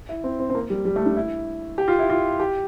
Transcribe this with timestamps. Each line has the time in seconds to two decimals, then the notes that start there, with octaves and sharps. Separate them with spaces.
0.09 E4
0.24 C4
0.40 C4
0.50 C4
0.55 A#3
0.70 G3
0.85 G3
0.96 A3
1.06 D4
1.17 E4
1.78 G4
1.88 F4
1.99 E4
2.10 F4
2.40 G4